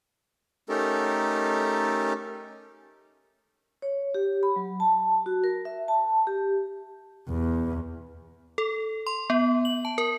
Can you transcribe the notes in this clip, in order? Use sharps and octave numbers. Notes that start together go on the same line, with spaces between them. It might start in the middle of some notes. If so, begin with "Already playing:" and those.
A3 C#4 D#4 G4 A4 A#4
C#5
G4
B5
F#3
A5
F#4
A#4
E5
A5
G4
E2
A4
C6
B3
F#7
A5
A#4